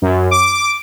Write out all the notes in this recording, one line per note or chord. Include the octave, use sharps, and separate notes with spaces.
F#2
D6